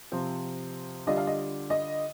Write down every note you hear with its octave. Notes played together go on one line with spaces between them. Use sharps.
C3 F3 C4
D3 G3 D4 F4 D#5
F5
D#5
D#5